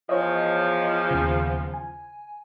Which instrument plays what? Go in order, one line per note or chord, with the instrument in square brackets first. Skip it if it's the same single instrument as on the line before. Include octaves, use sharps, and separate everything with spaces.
[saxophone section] E2 F3 [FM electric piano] C5 C#5 D#5
[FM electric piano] D#2 C#3
G#5